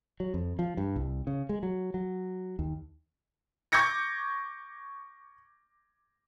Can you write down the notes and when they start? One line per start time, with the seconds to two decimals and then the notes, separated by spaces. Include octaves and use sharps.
0.20 F#3
0.34 F2
0.59 F3
0.77 G2
0.96 C2
1.27 C#3
1.49 G#3
1.63 F#3
1.94 F#3
2.59 D#2
3.72 C#6 D6 G6 G#6 A#6 C#7